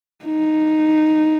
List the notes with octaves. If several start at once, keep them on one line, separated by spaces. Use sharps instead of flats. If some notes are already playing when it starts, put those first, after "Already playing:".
D#4